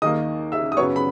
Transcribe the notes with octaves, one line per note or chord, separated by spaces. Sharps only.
D#2 D#3 A#3 D#5 D#6
E5 E6
D#6
F#2 C#3 F#3 B3 C#5 C#6
B5